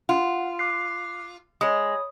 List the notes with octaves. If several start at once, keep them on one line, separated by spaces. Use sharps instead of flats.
F4 F#5
D6 F#6 C7
G#3 C#5 B5 D#6